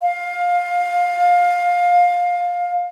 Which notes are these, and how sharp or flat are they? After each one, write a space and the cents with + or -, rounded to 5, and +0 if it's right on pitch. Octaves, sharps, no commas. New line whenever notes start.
F5 +20